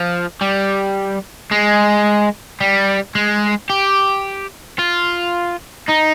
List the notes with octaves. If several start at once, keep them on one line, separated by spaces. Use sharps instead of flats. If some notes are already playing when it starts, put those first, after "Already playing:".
Already playing: F3
G3
G#3
G3
G#3
G4
F4
D#4